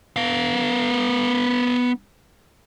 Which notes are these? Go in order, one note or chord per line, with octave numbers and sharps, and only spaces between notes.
B3 F5